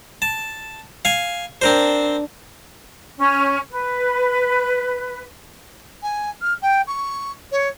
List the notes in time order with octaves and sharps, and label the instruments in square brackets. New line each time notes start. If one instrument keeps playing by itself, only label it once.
[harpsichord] A5
F5 G#5
[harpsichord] C4 A#4 C5 [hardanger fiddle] D4
[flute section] C#4
B4
[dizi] G#5
F6
G5
C#6
C#5